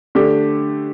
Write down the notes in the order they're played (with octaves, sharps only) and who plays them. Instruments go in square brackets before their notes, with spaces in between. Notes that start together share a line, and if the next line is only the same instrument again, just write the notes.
[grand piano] D3 A3 D4 G4